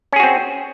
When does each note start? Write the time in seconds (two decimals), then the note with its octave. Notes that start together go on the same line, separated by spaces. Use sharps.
0.13 C#4
0.16 G#4
0.20 F#4
0.23 C4